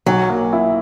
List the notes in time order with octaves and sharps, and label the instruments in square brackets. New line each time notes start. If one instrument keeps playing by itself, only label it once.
[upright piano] B1 [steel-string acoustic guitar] F#3
[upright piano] A#3
E4